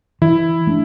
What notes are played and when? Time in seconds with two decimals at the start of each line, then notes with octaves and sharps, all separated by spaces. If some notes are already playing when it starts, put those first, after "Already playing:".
0.22 E3 E4
0.67 A3 D4